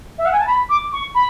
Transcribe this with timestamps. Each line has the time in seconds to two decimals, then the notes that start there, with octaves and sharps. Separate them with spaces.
0.18 E5
0.25 F#5
0.32 G#5
0.40 A5
0.47 B5
0.69 D6
0.92 C#6
1.15 B5